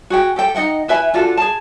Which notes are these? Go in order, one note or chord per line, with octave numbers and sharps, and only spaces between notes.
F#4 G#4 G5
G4 A4 G5
D#4 D#5 F#5 G5
E4 B4 E5 G#5
D4 F4 F#4 A4
G#4 A5